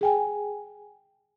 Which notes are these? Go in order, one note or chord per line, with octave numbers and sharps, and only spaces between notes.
G#4 G5 G#5